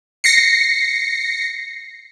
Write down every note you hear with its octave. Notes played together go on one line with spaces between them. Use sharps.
A#6 C7 C#7